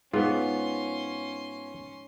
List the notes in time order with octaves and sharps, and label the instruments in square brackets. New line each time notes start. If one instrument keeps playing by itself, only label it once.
[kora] G#2 [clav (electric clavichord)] B3 F4 [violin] C#4 C6